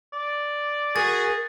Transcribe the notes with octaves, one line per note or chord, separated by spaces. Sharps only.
D5
F#4 G#4 A#4 A6